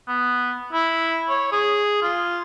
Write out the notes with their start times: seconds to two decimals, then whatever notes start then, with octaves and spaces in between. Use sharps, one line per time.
0.08 B3
0.73 E4
1.29 C#5
1.52 G#4
2.02 F4